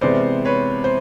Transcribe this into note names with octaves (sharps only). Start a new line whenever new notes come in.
C3 E3 G#3 B3 C5 D5
B4 C#5
C5